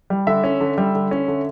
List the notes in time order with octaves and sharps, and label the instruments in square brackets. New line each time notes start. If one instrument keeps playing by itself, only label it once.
[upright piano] G3
D3 E5
C#4
D3
G3
D3
C#4
D3